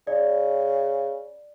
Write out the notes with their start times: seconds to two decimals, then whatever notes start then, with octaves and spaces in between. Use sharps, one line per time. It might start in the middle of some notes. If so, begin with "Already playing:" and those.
0.07 C#3 D5